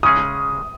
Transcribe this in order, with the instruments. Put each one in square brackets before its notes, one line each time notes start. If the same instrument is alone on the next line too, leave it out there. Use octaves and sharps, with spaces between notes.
[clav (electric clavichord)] C#3 G#3 C#4 G#4 [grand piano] D#6